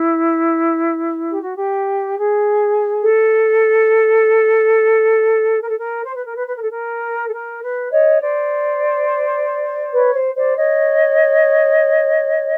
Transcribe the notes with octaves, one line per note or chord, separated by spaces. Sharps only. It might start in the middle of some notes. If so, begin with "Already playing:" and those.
Already playing: E4
G4
F#4
G4
G#4
A4
A#4
A4
A#4
C5
B4
A#4
B4
B4
A#4
A4
A#4
A4
A#4
B4
C#5 D#5
C5 D5
B4 C#5
C5
C5 D5
C#5 D#5